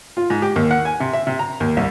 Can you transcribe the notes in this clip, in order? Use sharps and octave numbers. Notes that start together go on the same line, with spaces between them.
F4
G#2
G4
D#2
F#5
G#5
C3
E5
C3
A#5
D#2
C2